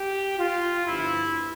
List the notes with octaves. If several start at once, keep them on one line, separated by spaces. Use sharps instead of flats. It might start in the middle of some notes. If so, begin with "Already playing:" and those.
Already playing: G4
F4
G1 G2 D3 F3 E4